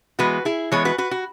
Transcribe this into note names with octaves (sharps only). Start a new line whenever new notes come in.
E3 G#3 B3 F#4 B4
E4 G#4
E3 G#3 B3 G#4 C#5
F#4 B4
F#4 B4
F#4